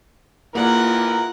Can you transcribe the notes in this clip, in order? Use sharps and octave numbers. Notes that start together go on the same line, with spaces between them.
E3 A#3 F4 G#4 A#4 D5 F#5